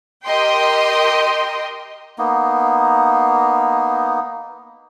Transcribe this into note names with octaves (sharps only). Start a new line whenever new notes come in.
G4 A#4 D#5 G5 C6
A#3 B3 D#4